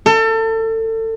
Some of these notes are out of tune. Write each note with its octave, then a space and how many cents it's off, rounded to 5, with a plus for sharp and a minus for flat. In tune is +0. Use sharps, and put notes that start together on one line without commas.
A4 +30